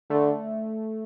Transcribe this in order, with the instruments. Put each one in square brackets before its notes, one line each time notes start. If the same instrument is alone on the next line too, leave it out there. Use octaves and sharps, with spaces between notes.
[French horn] D3 [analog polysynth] A3